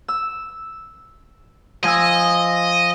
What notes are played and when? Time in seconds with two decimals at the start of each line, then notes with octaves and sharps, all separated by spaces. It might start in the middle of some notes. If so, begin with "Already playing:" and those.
0.08 E6
1.83 F3 D#5 G#5 E6